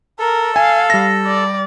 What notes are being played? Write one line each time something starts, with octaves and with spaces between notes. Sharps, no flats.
A4 A#4
F5 G#5
G3 A#6
D5